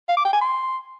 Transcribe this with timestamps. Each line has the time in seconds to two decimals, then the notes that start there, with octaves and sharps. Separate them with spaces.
0.09 F5
0.17 D6
0.25 G5
0.33 G#5
0.41 C6